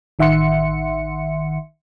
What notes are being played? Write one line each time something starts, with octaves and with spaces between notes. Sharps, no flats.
A1 D#3 E5 F#5 C6 C#7